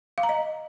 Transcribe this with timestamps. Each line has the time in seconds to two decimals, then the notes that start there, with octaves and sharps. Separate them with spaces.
0.18 F5
0.23 A#5
0.29 D#5